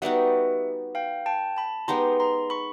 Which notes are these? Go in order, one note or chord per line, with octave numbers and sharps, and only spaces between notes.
G3 B3 D#4 F#4 E5 F#5
F5 G5
G5 A5
A5 B5
G#3 B3 D#4 G4 A#5 C6
A#5 C6
B5 C#6